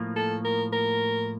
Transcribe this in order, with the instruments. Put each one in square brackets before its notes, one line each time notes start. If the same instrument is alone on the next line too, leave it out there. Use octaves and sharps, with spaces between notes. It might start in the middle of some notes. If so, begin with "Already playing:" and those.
Already playing: [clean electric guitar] A2 F3 A#3
[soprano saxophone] A4
A#4
A#4